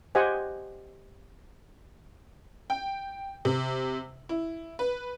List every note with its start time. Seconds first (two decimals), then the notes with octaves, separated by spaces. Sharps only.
0.15 G4 C5 D#5 F#5 G#5
2.70 G5
3.45 C3
4.29 E4
4.79 B4